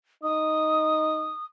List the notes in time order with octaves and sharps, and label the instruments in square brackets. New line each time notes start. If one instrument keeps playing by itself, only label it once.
[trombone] D#4 [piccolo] D#6